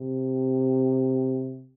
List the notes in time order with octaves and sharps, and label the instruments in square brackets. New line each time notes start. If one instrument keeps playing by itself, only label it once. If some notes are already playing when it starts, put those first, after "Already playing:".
Already playing: [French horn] C3